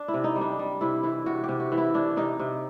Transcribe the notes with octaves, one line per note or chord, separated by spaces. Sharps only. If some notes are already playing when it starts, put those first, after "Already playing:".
Already playing: D4
E4
C3
D#4
G3
D4
G3
C3 E4
E3 E4
C3 F#4
C3 G4
F#4
E3
E4
C3 D4
C3 D#4
C3